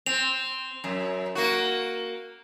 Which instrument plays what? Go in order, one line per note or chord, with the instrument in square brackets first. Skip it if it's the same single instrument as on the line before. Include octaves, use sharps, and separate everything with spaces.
[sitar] C4 [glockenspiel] F7
[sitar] F#2
A#3 F#4